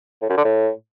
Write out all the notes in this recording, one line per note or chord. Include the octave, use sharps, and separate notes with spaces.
A2
F#2
D3
A2